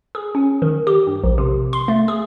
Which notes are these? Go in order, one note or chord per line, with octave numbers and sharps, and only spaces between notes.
G#4
C#4
D#3
G4
G2
A#1
C3
C6
A3
G#4